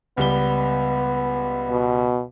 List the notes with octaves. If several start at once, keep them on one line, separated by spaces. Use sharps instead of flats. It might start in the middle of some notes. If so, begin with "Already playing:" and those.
C#2 G3 B3 G7
B2